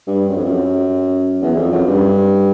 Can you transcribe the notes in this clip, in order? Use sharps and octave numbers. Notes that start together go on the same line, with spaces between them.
G2
F#2
F2
F#2
E2
F2
F#2
G2